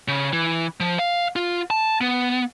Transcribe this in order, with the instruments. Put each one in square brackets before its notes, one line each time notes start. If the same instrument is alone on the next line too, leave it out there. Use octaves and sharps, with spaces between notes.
[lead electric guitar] C#3
E3
F3
F5
F4
A5
B3